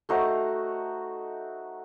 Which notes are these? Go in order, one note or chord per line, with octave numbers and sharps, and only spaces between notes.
A3 D#4 F#4 C5